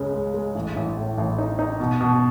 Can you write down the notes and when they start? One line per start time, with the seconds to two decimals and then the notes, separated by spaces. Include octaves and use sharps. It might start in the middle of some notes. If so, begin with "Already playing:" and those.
Already playing: C#2 C#3 G#3
0.13 G#3
0.34 G#3
0.55 A1
0.76 A1
0.97 A2
1.18 A1
1.38 D#4
1.59 D#4
1.80 B2
2.01 B2